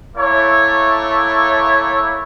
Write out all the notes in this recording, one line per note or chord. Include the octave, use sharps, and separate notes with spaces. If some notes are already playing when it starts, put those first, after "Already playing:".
A3 A#3 E4 C#5